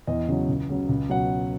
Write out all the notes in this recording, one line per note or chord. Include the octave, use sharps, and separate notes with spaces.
E2 D#5
C#3 F#3
C#2
C#3 F#3
C#2
B2 F#3 F#5